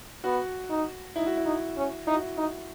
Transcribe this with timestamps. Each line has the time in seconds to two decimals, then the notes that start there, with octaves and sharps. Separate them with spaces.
0.24 B3 F#4
0.70 D#4
1.16 D#4 E4
1.26 F#4
1.37 E4
1.45 D#4
1.77 C#4
2.07 D#4 E4
2.14 F#4
2.21 E4
2.37 D#4